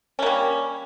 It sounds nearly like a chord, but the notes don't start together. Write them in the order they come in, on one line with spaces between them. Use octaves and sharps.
C#4 A#3 G3